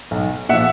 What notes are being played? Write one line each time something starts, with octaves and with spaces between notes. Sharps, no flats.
B1
A#2 F3 E5 F#5